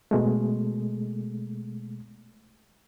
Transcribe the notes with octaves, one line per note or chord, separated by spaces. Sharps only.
B2 G#3 A3